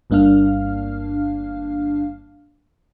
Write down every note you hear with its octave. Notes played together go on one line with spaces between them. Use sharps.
G1 G2 A#3 D4 F5 F6